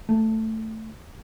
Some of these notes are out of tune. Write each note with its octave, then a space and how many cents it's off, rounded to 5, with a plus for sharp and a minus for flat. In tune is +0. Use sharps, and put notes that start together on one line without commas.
A3 +5